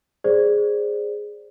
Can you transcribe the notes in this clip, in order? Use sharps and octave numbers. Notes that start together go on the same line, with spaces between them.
G#4 C5 D5